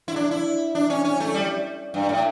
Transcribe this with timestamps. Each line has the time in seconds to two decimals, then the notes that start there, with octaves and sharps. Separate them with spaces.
0.08 E4
0.16 D4
0.31 E4
0.75 D4
0.90 C#4
1.05 C#4
1.20 A3
1.34 G3
1.94 G2
2.09 A2